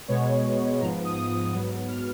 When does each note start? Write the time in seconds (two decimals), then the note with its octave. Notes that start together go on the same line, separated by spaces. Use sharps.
0.08 B2 G#3 B3 C#5
0.80 G#2 F3 B3 A#5
1.05 D#6
1.52 G#2 F#3 B3
1.88 F6